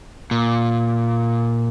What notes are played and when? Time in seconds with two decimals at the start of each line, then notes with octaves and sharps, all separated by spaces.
0.31 A#2